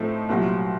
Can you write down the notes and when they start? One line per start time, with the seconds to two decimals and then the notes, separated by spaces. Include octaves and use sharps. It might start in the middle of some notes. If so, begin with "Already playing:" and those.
Already playing: A2 F3 A3 C4 D#4
0.29 C2 A#2 F#3